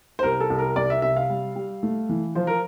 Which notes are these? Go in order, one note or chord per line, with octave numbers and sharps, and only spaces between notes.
C5
C2 A#4
A4
C2
A#4
C2 D5
E5
C3 E5
F5
G3
G3
A3
E3
F3 C5
A#4